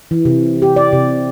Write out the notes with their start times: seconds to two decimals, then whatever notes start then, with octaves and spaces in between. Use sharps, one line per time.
0.11 E3
0.25 C3
0.62 G4
0.76 D5
0.93 C3